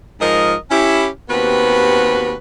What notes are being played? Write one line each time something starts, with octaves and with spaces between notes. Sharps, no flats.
G#2 F3 A#4 D#5
C#4 E4 G4
D#2 B3 C4 F#4 G4 B4